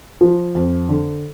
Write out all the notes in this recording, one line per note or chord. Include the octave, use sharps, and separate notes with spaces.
F3
F2
D3